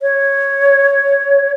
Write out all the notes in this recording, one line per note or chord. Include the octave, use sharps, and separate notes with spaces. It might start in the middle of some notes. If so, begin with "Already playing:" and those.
C#5